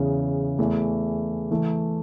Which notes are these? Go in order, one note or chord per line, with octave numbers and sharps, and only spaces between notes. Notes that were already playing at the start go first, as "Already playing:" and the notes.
Already playing: E2 C#3 E3
E2 E3 A3
E3 A3